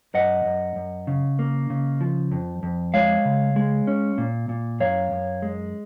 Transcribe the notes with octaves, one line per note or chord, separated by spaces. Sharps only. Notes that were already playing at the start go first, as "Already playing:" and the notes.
F#2 D#5 F#5
F#2
F#2
C#3
A#3
C#3
F3
F2
F2
G#3 C#5 F5
C#3
G#3
C#4
A#2
A#2
F#2 C#5 F5
F#2
G#3